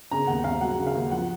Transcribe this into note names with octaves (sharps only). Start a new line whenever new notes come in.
C#3 A#5
D#2 F#5
D#2 F5
F#3 F#5
C#3
F5
D#2
F3 F#5